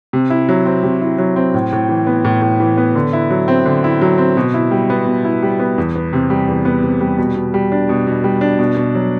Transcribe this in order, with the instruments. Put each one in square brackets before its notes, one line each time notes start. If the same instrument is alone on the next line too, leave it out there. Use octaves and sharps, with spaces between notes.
[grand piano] C3
E4
F#3
C4
C3
E4
F#3
C4
A2
A2
E3
B3
A2
A2
E3
B3
D3
E4
F#3
C4
D3
E4
F#3
C4
B2
E4
G3
B3
B2
E4
G3
B3
E2
B3
C3
G3
E2
B3
C3
G3
B2
B2
G3
D4
B2
B2
G3
D4
B2
B2
F#3